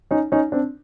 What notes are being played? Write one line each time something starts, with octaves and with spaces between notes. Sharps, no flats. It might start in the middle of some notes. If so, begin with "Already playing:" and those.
C#4 D#4
C#4 D#4
C4 D4